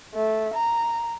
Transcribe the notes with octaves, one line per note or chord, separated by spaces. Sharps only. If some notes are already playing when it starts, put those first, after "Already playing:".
A3
A#5